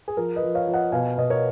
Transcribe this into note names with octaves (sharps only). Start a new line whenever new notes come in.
G#4
F3 A#4
B4 D#5
F3
C#5 F5
F3
D#5 F#5
B2 F5 G#5
B2 D#5
A#4 C#5